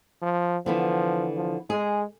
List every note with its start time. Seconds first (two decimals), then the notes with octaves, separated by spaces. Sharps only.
0.22 F3
0.66 D3 E3 F3 B3
1.36 F3
1.70 G#3 G#4